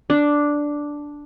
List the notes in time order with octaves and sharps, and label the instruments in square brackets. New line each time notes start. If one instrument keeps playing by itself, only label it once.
[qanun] D4